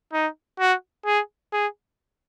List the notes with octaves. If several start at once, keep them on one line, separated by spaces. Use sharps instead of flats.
D#4
F#4
G#4
G#4